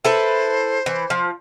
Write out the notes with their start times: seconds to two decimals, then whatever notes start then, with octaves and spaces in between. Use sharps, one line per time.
0.04 E4 A4 B4 C5
0.86 E3
1.10 F3